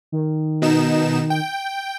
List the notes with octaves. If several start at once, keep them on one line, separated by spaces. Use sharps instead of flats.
D#3
B2 D#4 E7
G5